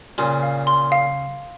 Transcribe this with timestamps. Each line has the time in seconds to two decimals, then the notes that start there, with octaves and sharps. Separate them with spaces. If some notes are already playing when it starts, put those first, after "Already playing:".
0.18 A#2 C#3 C6
0.43 F5
0.67 C6
0.92 F5